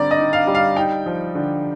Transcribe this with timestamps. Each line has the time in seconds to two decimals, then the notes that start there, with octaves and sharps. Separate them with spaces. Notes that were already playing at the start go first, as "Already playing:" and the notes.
Already playing: D3 G3 C4 D5 A#5
0.11 D#5
0.18 D#4
0.33 F5
0.47 G3
0.55 F5
0.76 D#4 G5
1.06 F3
1.35 D3